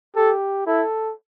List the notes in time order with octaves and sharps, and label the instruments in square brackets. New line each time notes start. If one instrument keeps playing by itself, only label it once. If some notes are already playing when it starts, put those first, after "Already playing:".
[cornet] G4 [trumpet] A4
[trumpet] E4 [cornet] A4